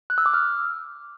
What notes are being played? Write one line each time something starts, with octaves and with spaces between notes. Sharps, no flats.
F#6
E6
D6
F6